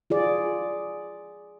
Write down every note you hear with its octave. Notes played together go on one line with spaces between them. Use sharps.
F4 G#4 D5